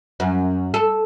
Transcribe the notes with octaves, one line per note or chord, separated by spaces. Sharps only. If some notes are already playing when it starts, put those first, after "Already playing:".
F#2
A4